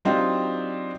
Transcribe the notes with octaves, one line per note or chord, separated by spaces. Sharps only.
F#3 C4 D4 D#4 F4 G4